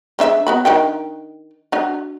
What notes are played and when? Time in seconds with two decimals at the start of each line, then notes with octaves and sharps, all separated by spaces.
0.19 G#3 D4 E5
0.47 B3 F#4 B5
0.65 D#3 D4 G5
1.72 D4 F#4